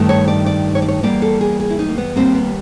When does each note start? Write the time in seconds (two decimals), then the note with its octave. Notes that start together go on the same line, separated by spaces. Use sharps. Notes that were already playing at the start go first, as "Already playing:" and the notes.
Already playing: G2 D#3 A3
0.09 C#5
0.28 D5
0.46 D5
0.75 C#5
0.82 D5
0.88 C#5
1.03 E2 B2 G3 A#3 D5
1.22 A4
1.41 G#4
1.60 G#4
1.70 E4
1.79 D#4
1.89 A#3
1.98 B3
2.16 D#2 D#3 G3 A#3 C4
2.35 B3